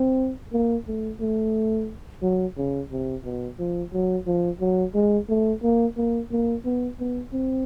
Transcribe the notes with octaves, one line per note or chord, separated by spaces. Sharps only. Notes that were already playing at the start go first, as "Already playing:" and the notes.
Already playing: C4
A#3
A3
A3
F#3
C#3
C3
B2
F3
F#3
F3
F#3
G#3
A3
A#3
A#3
A#3
B3
B3
C4